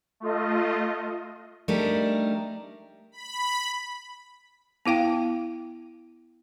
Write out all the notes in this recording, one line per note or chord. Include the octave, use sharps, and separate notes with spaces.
A3 F4 D#5
G3 A3 D4 D#4 A#4
B5
B3 E4 F5 G5